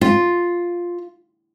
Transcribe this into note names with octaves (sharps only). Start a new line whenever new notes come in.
F4